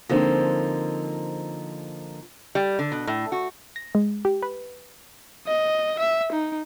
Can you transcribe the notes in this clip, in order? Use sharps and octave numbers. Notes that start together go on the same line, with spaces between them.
D3 F3 A#3 C4 D#4
G3
D3
B2
A2
F#4
A#6
G#3
G4
B4
D#5
E5
D#4